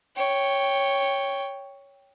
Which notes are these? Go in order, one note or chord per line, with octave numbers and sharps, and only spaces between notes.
C#5 G5